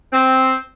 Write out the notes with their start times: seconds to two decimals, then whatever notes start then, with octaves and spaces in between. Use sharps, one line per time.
0.13 C4